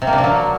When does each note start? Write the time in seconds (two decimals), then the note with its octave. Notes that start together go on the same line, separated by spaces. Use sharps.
0.02 C3
0.07 A#3
0.13 D4
0.18 A#3
0.24 F#3